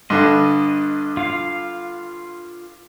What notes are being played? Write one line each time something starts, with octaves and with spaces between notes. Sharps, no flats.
G2 D3 D#5
F4 F5